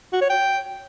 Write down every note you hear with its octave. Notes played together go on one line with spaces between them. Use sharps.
F#4
C#5
G5